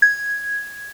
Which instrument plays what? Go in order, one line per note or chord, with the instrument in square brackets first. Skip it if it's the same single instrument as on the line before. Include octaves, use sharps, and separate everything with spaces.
[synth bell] G#6